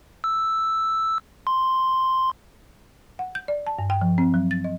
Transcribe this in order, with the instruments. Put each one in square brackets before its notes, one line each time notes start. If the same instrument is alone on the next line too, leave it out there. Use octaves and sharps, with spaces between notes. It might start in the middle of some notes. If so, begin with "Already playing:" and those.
[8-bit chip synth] E6
C6
[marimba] F#5
G6
D5
A5
G2
G5
F3
C4
F#3
A6
D#5